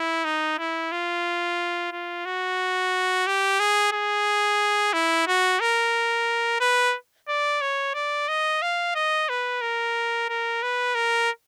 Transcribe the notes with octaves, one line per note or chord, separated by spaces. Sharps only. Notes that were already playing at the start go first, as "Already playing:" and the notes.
Already playing: E4
D#4
E4
F4
F4
F#4
G4
G#4
G#4
E4
F#4
A#4
B4
D5
C#5
D5
D#5
F5
D#5
B4
A#4
A#4
B4
A#4